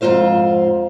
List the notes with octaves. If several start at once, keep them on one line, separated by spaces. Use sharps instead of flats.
F2 G#2 C3 F4 C5 F5